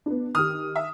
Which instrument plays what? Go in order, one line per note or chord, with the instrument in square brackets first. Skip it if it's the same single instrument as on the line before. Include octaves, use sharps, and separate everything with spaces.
[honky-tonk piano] B3 D4
[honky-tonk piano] D#3 G4 [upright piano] D#6 F6
[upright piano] E5